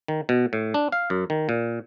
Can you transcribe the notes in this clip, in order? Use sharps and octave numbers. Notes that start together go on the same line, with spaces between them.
D#3
B2
A2
D4
F5
F#2
D#3
A#2